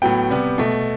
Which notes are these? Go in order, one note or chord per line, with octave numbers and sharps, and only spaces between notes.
A2 F#3 B3 G5
C3 G3 B3
B2 A3